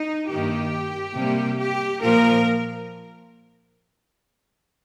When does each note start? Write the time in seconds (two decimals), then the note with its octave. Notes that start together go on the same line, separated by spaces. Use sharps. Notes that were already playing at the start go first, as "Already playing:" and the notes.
Already playing: D#4
0.30 G2 D#3 A#3 G4
1.16 C3 G3 A#3
1.59 G4
2.02 A#2 F3 A#3 A#4